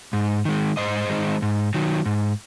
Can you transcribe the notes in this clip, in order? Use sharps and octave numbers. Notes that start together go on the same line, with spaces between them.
G#2
D#3 G#3
G#2 C5 D#5
D#3 G#3
G#2
D#3 F#3
G#2